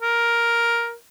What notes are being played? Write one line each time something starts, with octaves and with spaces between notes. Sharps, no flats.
A#4